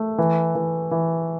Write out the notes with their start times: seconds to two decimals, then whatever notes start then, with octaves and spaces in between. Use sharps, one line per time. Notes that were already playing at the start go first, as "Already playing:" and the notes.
Already playing: A3
0.18 E3
0.55 E3
0.91 E3